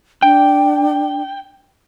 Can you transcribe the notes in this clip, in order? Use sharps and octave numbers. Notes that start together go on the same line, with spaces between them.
D4 G5